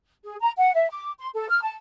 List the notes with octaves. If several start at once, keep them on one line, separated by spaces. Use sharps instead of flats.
G#4
A#5
F#5
E5
D6
C6
A4
F6
A5